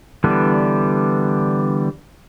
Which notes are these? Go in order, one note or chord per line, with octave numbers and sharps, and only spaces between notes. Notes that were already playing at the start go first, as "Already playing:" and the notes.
D3 E3 G3 B3 D4